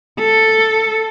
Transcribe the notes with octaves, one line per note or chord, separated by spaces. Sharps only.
A4